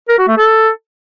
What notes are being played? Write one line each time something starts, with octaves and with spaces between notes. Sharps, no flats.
A#4
F#4
A3
A4